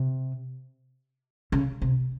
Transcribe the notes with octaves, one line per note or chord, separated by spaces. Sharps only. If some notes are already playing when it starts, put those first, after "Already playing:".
Already playing: C3
C#3
C3